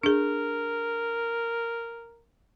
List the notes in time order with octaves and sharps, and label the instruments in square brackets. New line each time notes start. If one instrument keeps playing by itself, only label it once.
[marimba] D4 G#4 [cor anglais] A#4